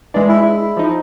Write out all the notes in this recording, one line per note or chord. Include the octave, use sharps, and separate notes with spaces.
E3 G#3 D4
E4
E4
F3 D#4